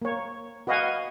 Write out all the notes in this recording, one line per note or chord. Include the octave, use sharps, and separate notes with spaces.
A#3 C#5
F#4 B4 D#5 F5 F#5 G#5